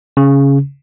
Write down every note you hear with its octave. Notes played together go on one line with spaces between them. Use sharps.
C#3